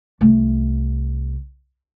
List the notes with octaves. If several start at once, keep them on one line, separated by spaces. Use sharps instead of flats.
C2 A3